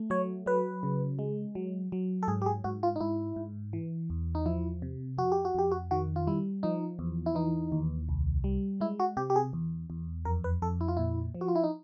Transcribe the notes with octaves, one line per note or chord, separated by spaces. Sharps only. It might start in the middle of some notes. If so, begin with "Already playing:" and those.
Already playing: A3
F#3 C#5
F#3 B4
C#3
G#3
F#3
F#3
A4
G#2 G#4
G4
G#4
G#2 F#4
F4
D#4
G#2 E4
G#2
E3
E2
D#4
F3 E4
C3
F2 F#4
G4
F#4
F2 G4
F#4
D#3 F#4
F4
G3 E4
F3 D#4
E2
E4
E3 D#4
D#2
C2
G3
G#3 E4
F#4
C3 G4
G4
G#4
E2
E2
F2 A#4
B4
F2 A4
E4
F4
A#2 E4
F3
F#4
F4
E4
D#4